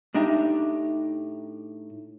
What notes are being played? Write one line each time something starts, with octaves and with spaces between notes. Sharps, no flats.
A2 D4 D#4 G4 E5